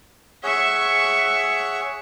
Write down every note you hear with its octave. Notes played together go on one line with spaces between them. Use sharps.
G#4 C#5 E5 F#5 C#6